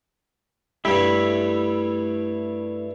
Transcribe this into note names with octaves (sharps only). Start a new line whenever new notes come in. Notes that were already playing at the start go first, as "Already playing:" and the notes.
G2 G3 A3 E4 E5